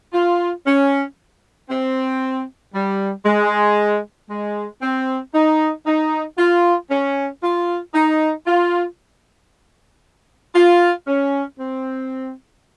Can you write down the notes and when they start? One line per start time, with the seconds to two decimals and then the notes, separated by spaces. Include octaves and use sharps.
0.13 F4
0.66 C#4
1.70 C4
2.74 G3
3.25 G#3
4.30 G#3
4.81 C4
5.33 D#4
5.86 D#4
6.38 F4
6.90 C#4
7.42 F4
7.94 D#4
8.47 F4
10.54 F4
11.07 C#4
11.58 C4